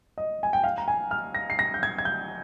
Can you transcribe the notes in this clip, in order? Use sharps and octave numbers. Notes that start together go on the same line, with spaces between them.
D#5
G#5
G5
F5
A#5
G#5
F6
A#6
C7
A#6
G6
G#6
G#6
G6